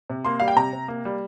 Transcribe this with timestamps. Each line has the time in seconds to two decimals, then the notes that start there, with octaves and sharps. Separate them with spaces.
0.10 C3
0.25 A#3 C6
0.40 G3 F5
0.48 G5
0.56 C3 A#5
0.73 C3
0.88 A#3
1.05 G3